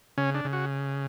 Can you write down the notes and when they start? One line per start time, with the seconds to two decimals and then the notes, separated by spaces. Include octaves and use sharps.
0.18 C#3 C#4
0.34 D4
0.45 C#3
0.53 F#4